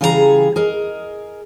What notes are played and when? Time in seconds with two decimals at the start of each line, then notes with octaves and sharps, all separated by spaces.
0.01 C#3 E3 G3 G#4 A4 A#5
0.56 G#4 A#4 D#5